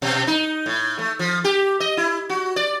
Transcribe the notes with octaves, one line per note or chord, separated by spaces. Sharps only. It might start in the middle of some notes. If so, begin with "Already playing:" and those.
B2
D#4
A2
A3
F3
G4
D#5
E4
F#4
D5